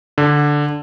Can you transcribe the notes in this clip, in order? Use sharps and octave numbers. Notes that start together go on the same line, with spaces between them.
D3